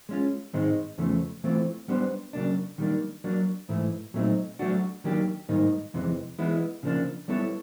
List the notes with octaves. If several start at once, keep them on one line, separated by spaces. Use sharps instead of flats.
G#3 C#4 F4
G#2 D#3 G#3 C4 D#4
E2 C#3 F3 A3
E3 A3 C4 F4
G3 B3 D4 G4 C5
C#3 F#3 A#3 D4
D#3 G3 A#3 D4
F#3 A#3 D4
G#2 E3 A3
A#2 F#3 A3 C4 D#4
F#3 A3 D4 F#4
D#3 F#3 A#3 D4 G4
G#2 D#3 G3 A#3 D#4
F2 C3 E3 G#3
E3 G#3 B3 E4
C#3 F3 A#3 D4
G3 B3 E4 A4 C#5